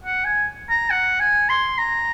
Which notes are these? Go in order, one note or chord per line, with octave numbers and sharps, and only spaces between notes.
F#5
G#5
A#5
F#5
G#5
C6
A#5